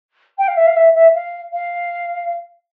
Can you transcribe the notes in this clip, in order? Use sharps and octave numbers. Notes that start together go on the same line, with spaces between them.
G5
F5
E5
F5
E5
E5
F5
F5